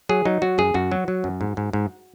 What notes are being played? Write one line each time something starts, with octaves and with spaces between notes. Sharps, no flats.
F#3 G#4
F#3 D#4
F#3 F#4
F#2 G#4
F#2 F#4
F#3
F#3
F#2
G#2
G#2
G#2